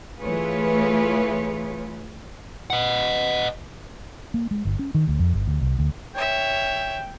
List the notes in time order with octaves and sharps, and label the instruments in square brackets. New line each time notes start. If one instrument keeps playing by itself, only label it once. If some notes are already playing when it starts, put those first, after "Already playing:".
[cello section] E3 A3 F4 G#4 B4 C#5
[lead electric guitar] D#5 F#5
[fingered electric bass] A#3
G#3
G1
C#4
D#3
D2
F2
G1
D2
C2
D2
[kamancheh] C#5 E5 [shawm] G5